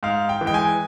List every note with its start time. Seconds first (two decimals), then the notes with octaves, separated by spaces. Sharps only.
0.03 G#2 F5
0.29 G5
0.41 E3
0.46 G#3 G5
0.54 G#5